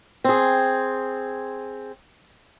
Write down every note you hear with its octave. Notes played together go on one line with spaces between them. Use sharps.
C4 G#4